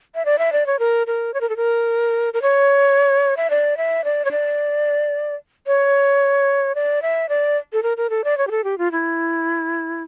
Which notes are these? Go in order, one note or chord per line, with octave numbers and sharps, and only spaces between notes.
E5
D5
E5
D5
C#5
A#4
A#4
C#5
A#4
A4
A#4
A#4
C#5
E5
D5
E5
D5
C#5
D5
C#5
D5
E5
D5
A4
A#4
A#4
A4
D5
C#5
G4
A4
G4
F4
E4